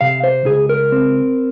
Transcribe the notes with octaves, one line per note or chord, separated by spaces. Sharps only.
C3 F5
C5
C#2 G#4
A#4
C4